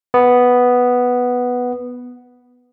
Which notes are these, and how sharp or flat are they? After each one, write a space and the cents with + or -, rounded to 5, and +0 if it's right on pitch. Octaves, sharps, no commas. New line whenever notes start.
B3 +0